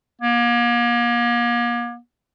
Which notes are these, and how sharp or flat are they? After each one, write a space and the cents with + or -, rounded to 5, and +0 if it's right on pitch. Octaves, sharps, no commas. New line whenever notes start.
A#3 +40